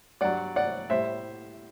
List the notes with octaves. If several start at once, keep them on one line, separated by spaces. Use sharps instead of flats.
G2 F#3 D5 F#5
D5 F#5
A2 G3 C5 E5